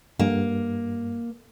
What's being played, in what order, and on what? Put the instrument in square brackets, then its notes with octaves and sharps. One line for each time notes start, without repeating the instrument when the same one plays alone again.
[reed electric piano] G2 [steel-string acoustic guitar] A#3